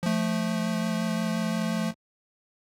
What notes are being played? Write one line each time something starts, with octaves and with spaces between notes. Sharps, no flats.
F3 A3